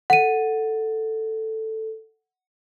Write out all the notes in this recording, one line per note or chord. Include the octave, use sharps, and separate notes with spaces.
A4 F#5 D#7